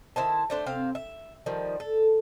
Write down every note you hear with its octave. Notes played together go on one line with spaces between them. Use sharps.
D#3 E4 C5 A5
A3 D4 C5
C3 C4 F5
E5
D#3 F3 G3
A4